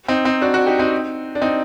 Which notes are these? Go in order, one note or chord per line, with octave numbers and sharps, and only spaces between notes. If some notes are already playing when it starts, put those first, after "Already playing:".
C4 D#4
C4 D#4
D4 F#4
D4 F#4
D#4 G4
C4 D#4
D4
C4 D#4